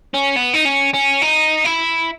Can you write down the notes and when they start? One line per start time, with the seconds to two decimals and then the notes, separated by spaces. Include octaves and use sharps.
0.14 C#4
0.36 B3
0.54 D#4
0.65 C#4
0.93 C#4
1.22 D#4
1.65 E4